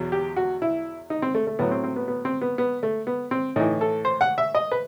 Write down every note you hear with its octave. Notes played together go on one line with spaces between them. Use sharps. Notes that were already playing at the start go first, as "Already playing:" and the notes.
Already playing: E2 B2 F#3
G4
F#4
E4
D#4
C4
A3
A3
A2 F#3 B3
C4
C4
B3
B3
C4
B3
B3
A3
B3
C4
A2 E3 D#4
A4
C5
F#5
E5
D#5
B4